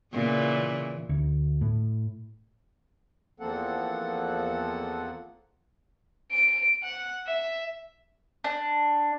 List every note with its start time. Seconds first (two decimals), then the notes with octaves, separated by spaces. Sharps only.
0.13 A#2 C#3 E3
1.09 D2
1.61 A2
3.40 E2 F3 A#3 C4 A4 F#5
6.32 D7
6.83 F#5
7.27 E5
8.44 D4